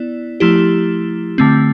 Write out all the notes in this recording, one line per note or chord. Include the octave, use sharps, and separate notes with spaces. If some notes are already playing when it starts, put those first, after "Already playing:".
Already playing: B3 E4 D5
F3 A3 E4 G4
D3 A3 C4